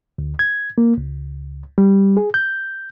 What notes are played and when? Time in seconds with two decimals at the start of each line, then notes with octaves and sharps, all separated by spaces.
0.18 D2
0.39 G#6
0.78 A#3
0.98 C#2
1.78 G3
2.17 G#4
2.34 G6